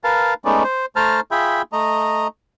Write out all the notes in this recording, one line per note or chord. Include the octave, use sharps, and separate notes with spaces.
A#4 B4 F5 A5
G#3 A3 B3 C#4 D#4 D5
C5
A3 C5 A5 A#5 F6
F4 G#4 E5 G5 B5
A3 D#5 A#5